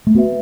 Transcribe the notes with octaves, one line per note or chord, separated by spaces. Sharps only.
A3
B3 F#4 B4 E5